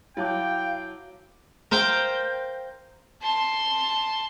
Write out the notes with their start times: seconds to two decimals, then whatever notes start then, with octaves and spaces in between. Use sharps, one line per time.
0.17 F#3 E4 F5 G5 A5 D6
1.71 A#4 C5 F5 G5
3.22 A5 C6